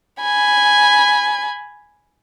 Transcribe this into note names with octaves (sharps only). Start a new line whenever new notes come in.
G#5 B5